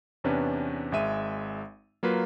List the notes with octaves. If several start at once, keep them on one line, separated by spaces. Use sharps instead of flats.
E2 C3 C#4 D4 B4
G#1 G#3 E5 D#7
F#3 A#3 F4 B4